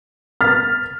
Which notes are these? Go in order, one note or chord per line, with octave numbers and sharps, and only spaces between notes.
F6 A6 B6